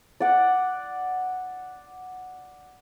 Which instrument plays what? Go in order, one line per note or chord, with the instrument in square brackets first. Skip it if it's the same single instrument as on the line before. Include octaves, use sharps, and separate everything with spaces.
[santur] D5 F#5 D6